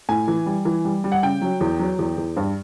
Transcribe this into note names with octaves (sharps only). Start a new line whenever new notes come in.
A2 G#5
E3
G3
E3
G3
G3
F#5
C#3 G5
F#3
E2
F#3
E2
E2
G2